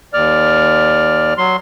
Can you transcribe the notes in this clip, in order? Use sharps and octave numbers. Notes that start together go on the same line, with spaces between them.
D#2 D5 F6
F#3 C6